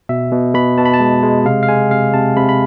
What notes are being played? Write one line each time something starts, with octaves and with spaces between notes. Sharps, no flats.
B2 E5
B2
B2 B5
B2 A5
B5
A5
G#3
G#3
C3 F5
F5
G#3 G#5
C3 F5
C3 A5
C3 B5
B5